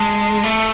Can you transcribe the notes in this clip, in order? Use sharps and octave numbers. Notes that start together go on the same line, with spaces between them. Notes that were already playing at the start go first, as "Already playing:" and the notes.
Already playing: G#3 A5
A3